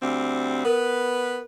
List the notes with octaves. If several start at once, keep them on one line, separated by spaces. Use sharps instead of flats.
D2 G3 C4
B3 A#4 B4